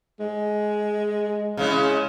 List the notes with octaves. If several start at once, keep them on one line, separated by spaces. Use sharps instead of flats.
G#3
C#3 G#3 E4